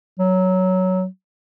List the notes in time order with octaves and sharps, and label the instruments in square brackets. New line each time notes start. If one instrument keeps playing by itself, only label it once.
[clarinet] F#3